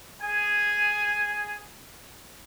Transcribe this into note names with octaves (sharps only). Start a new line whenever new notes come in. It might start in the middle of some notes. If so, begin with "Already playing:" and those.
G#4 G#5